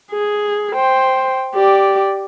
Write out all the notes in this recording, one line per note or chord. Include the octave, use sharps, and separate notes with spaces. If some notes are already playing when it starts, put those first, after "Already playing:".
G#4
C5 G5
G4 D5